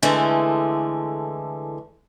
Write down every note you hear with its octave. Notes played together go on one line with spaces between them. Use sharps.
D3 E3 G#3 A3